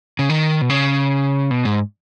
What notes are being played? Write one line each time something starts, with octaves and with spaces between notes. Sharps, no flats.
C#3
D#3
B2
C#3
B2
G#2